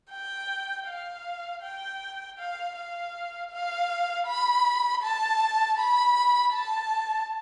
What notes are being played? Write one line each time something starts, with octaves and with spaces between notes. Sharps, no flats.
G5
F5
G5
F5
F5
F5
B5
A5
B5
A5